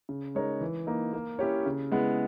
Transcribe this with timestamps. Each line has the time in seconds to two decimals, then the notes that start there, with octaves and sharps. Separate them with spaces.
0.09 C#3
0.35 G#3 D#4 A#4 C#5
0.61 E3
0.87 A#3 D#4
1.13 A#3
1.39 C#4 E4 G4 C#5
1.66 C#3
1.92 G#3 B3 E4